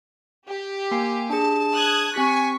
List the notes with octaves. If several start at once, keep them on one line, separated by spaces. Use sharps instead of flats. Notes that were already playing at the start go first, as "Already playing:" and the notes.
G4
A#3 G#5 C7
D4 G#4 A5
D#6 F#6 G#6
C4 G4 G#5 C#6 B6